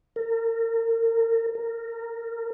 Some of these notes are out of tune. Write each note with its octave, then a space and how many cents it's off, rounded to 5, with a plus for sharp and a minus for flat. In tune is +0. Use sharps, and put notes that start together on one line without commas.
A#4 -35
A#4 -20